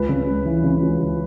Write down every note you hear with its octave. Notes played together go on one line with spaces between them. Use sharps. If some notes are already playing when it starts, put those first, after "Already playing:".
Already playing: C#2 B4
C#3
C#2
E3
C#3
C#2
C#2